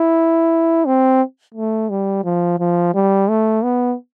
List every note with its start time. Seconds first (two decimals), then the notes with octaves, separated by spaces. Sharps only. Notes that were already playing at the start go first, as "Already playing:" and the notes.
Already playing: E4
0.85 C4
1.55 A3
1.90 G3
2.24 F3
2.59 F3
2.94 G3
3.29 A3
3.64 B3